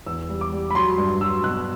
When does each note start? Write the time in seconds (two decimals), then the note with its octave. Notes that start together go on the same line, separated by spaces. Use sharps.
0.06 E2 E6
0.29 G3
0.41 D6
0.52 G3
0.71 B5
0.75 F#3 C6
0.98 G2
1.21 F#3 E6
1.44 B2 F#6